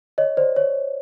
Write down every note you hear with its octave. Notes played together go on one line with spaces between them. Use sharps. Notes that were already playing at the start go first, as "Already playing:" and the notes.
C#5 D#5
C5 D5
C#5